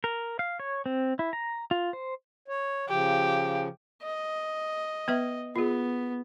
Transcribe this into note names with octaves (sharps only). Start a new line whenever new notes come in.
A#4
F5
C#5
C4
E4
A#5
F4
C5
C#5
C#3 F3 G4
D#5
B3 B4 E5
B3 F4 G#4